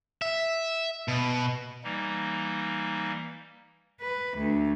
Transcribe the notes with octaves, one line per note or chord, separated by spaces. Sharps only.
E5
B2
E3 G3 A#3 D#4
B4
D2